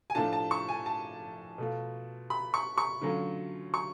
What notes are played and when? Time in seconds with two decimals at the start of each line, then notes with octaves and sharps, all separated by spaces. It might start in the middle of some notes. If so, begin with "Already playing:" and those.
0.10 G#5
0.15 A2 F3 A3 D4 F4 A5
0.33 A5
0.51 C#6
0.69 G#5
0.86 A5
1.58 B2 A3 F4
2.30 B5
2.54 C#6
2.78 C#6
3.02 D3 F#3 A3 C#4 F4
3.74 C#6